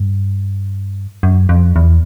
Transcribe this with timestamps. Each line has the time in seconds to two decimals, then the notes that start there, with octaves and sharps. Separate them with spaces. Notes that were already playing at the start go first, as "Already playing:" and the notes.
Already playing: G2
1.23 F#2
1.49 F2
1.76 E2